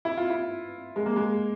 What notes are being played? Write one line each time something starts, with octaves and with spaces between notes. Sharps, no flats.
E4
F4
E4
G#3
A#3
G#3